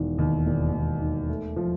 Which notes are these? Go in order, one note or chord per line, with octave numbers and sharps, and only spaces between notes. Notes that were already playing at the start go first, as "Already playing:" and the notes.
Already playing: E1 D#3
D#2
E1
E1
D#3
A3
F3